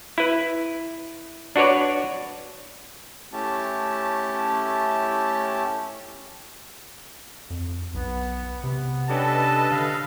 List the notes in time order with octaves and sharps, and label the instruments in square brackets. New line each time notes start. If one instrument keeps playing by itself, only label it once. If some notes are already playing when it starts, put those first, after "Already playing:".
[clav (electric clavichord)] E4 B4
D4 F#4 B4 C#5 D5
[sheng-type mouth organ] A3 C#4 E4 G4 A5
[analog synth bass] F2
[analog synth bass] B1 [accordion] B3
[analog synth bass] C3 [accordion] B3
[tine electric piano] C#4 D4 G4 [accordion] A4 B4 D#5 [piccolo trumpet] A5
[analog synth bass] D3 [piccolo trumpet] F5